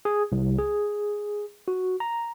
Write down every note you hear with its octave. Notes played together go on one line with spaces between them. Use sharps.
G#4
C2
G#4
F#4
A#5